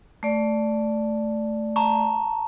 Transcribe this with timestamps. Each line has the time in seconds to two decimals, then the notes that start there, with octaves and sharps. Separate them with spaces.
0.23 A3 D5
1.76 A5 A#5 C#6